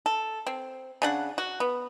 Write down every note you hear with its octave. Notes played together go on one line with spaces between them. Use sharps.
A4
C4
C#3 D4 F#5
F#4
B3